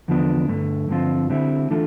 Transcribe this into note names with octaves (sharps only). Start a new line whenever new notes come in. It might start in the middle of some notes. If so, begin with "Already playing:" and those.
E2 D3 F3 B3 D4
G2 D3 A3
G2 D3 F3 C4 F4
D3 G3 C4 E4
E3 A3 D4 F4 A4